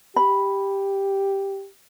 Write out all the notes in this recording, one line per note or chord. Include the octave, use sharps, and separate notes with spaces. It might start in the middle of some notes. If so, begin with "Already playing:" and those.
G4 B5